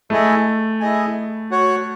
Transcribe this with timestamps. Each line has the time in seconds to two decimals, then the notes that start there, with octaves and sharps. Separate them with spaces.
0.10 A3 E4 G#4 D#5 G#5
0.80 E4 G#4 D#5 G#5
1.51 F#4 C#5 F#5